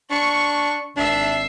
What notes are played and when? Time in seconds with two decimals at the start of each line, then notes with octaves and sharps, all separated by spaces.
0.11 D4 C#6
0.97 G#1 D4 E5 C7